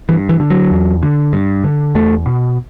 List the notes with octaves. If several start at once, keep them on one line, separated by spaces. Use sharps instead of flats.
G2 E3
E3
D3
F#3
E2
D3
G2
D3
E2 A3
B2